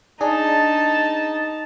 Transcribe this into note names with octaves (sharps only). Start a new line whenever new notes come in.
D4 D#4 G#4 A5